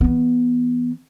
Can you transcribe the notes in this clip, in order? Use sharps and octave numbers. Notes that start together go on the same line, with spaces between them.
E3 B3